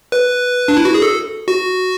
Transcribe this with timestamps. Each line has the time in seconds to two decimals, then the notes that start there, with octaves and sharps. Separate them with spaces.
0.12 B4
0.68 D4
0.77 E4
0.85 F#4
0.94 G#4
1.02 A4
1.48 F#4